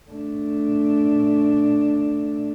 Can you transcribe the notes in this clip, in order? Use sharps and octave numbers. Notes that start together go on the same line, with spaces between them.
A3 D4